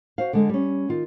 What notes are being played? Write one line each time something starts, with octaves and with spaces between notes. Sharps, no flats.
F#4 C5 F5
D3 G#3 A4
G3 C#4
D#3 F4